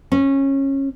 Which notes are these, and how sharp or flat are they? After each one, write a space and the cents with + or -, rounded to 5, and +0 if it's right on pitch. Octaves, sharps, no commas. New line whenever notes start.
C#4 -20